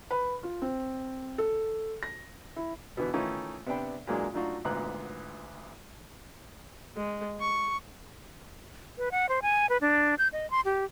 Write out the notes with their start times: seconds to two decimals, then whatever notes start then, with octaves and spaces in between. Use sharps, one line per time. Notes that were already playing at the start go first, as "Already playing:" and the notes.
0.11 B4
0.43 F4
0.62 C4
1.38 A4
2.03 A#6
2.56 E4
2.97 B2 D3 E3 B4
3.14 D#3 E3 A3 C#4 D#4 F4
3.66 C3 B3 D4 D5 G5 B5
4.07 A#2 E3 F#3 G#3 A#3 D4
4.34 F#3 A3 D4 D#4 F4 F#4
4.65 G#1 D2 A#2 B3 A#5 F#6
6.96 G#3
7.40 C#6
8.98 B4
9.12 F#5
9.29 C5
9.42 G#5
9.69 B4
9.81 D4
10.19 G6
10.33 D#5
10.51 C6
10.65 G4